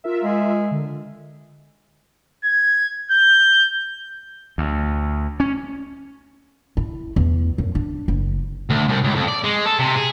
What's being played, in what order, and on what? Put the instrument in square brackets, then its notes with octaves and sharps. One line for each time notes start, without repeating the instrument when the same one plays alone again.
[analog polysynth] F4 A#4 E5
[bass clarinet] G#3
[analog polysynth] D3
[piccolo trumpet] G#6
G6
[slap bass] D2
C#4
[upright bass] E4
E2
F#2
D4
F#1
[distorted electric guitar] D2
C2
C#2
F2
D5
G#3
A4
C3
G#4